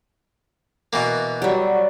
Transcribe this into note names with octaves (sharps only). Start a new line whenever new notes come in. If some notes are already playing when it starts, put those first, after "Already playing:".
B2 E3 A#3
F#3 G3 G4